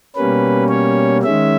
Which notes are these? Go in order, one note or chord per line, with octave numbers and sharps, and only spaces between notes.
B2 G3 A#3 C#4 B4
C#5
D#3 G#3 C#4 E5